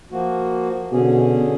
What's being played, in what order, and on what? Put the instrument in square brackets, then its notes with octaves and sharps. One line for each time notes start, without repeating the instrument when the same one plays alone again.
[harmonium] F3 A#3 F#4
[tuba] B2 [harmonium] D3 C#4 G#4